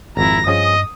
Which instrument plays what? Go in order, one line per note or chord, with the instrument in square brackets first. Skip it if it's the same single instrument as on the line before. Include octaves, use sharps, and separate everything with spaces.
[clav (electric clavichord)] G#1 F2 [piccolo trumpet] E4 [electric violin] A#5 A#6
[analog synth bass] G2 [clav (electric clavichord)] F3 C#4 G#4 [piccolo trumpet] D#5 [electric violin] D#6